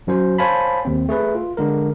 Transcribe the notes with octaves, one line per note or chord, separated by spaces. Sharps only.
F#2 F#3 C#4 C5
C5 C#5 F5 G#5 A5 B5
D#2 C4
A3 G#4 B4
F4
D3 G#3 A#4